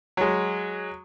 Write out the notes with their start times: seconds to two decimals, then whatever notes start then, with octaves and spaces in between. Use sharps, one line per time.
0.17 F#3 G#3